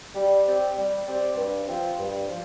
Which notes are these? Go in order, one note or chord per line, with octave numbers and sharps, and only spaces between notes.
G3
C4 G4 D5
G3
C4 G4 D5
G2
F3 C4
G2
F3